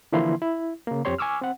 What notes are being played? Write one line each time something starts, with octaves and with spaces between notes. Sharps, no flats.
D3 E3 F3 A#3 E4 C6
E4
C#3 A#3
F2 C4 G4 C#5 C6
G#5 C#6 D6 E6 F6
C4 F#5